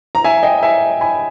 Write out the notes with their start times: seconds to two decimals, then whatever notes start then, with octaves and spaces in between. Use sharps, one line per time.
0.15 A#5
0.24 E5 G#5
0.43 D#5 G5
0.63 E5 G#5
1.01 G#5 B5